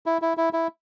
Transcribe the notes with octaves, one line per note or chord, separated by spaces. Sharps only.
E4
E4
E4
E4